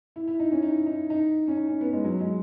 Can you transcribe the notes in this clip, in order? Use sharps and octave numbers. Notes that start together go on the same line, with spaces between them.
E4
E4
D#4
C#4
D#4
D#4
D#4
C#4
D#4
C#4
B3
G#3
F#3
G#3